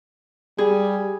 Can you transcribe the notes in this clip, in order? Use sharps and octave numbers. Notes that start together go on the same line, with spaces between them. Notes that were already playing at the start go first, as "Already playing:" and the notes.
G3 G#4